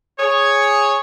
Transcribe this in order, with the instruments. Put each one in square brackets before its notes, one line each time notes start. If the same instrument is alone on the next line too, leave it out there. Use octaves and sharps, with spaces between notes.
[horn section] G#4 C#5